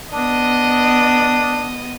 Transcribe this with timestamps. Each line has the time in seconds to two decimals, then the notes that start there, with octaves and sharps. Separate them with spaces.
0.13 B3 D4 D#5 D#6